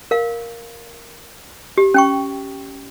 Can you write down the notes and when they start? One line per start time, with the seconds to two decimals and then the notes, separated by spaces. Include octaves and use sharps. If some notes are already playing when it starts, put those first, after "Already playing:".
0.11 A#4 F5
1.78 G4
1.94 C#4 G5 C#6